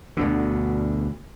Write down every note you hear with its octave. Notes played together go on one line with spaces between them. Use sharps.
D2 B2 D3